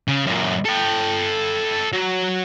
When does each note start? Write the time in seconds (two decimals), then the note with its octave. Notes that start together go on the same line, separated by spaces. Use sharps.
0.08 C#3
0.26 F#2 A#2
0.65 A4 G5
1.92 F#3